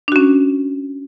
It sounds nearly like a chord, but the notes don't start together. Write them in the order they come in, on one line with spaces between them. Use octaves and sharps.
D4 F#4 C#4